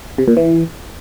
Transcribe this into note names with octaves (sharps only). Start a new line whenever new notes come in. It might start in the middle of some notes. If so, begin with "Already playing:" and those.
C3
A#2
E3